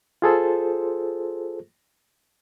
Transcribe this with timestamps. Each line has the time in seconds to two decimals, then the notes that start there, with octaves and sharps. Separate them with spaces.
0.22 F4 G#4 A4 C5